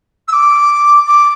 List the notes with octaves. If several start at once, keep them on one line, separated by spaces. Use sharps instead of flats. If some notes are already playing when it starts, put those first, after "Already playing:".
E6
D6
D6